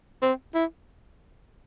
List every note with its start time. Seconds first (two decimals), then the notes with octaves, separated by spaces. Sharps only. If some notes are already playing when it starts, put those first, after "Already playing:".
0.22 C4
0.55 E4